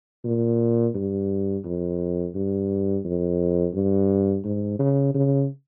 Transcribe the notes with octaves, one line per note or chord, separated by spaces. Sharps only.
A#2
G2
F2
G2
F2
G2
G#2
C#3
C#3